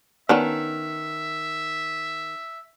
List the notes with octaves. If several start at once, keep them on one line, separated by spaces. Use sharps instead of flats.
D#3 B3 C#4 D4 E5